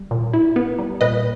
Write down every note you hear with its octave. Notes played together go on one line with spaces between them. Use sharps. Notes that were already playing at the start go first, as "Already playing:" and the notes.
Already playing: G3
A#2
E4
B3
G3
A#2 B4 D#5